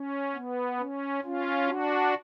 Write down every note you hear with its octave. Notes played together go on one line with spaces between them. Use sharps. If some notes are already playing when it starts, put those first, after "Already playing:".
Already playing: C#4
B3
C#4
C#4 F4
D4 F#4